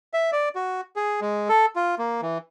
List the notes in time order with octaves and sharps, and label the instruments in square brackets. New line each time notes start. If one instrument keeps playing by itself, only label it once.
[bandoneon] E5
D5
F#4
G#4
G#3
A4
F4
A#3
E3